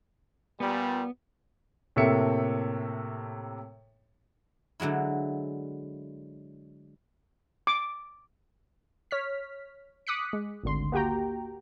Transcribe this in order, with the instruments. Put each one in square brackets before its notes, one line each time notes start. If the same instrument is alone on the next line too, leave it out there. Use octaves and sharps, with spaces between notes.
[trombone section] A#2 G3 [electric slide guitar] B3
[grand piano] A2 C3 A#3 A4 E5 C#7
[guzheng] D3 F#3 G#3 E4
[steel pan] D6
[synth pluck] C#5 F6 B6
D6 D#6 F#6 B6 C#7
G#3
G#1 D2 D3 C6
A#3 F#4 G4 G5 A#5